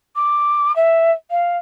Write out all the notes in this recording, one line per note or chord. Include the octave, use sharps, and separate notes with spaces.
D6
E5
F5